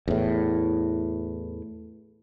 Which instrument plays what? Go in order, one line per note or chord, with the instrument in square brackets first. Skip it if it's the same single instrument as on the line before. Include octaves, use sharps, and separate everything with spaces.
[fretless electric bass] E2 A2